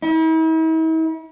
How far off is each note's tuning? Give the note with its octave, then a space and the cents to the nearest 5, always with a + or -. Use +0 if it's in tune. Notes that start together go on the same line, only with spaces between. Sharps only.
E4 -45